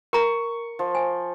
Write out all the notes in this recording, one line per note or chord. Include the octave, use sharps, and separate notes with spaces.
A#4 A#5 C#6
F3
G#5